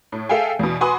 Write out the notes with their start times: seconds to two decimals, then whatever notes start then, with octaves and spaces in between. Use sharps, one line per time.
0.12 A2
0.29 G#4 A4 E5 F5 G5 G#5
0.59 E2 B2
0.81 F#4 B4 G#5 C6 D6 D#6